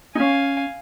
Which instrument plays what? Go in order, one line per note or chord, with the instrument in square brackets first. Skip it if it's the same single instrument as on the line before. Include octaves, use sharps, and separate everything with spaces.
[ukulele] C#4 D#4 [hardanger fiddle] F5 G#5